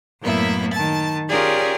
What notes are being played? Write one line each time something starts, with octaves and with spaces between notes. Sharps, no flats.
F#2 A2 A#3 B3 E4 E5
D#3 A5 A6
C#4 F4 G4 G#4 A#4 D5